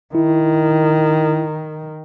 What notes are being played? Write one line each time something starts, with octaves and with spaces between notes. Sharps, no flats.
D#3 E4